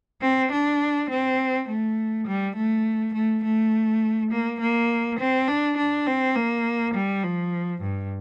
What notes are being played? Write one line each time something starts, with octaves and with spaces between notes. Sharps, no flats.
C4
D4
C4
A3
G3
A3
A3
A3
A#3
A#3
C4
D4
D4
C4
A#3
G3
F3
G2